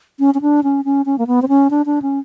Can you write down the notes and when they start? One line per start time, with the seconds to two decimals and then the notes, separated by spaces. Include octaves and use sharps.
0.19 C#4
0.34 C#4
0.41 D4
0.63 C#4
0.85 C#4
1.06 C#4
1.18 A#3
1.27 B3
1.42 C4
1.48 C#4
1.70 D4
1.86 D4
2.02 C#4